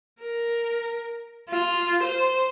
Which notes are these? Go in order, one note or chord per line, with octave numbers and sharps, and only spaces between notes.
A#4
F4
C5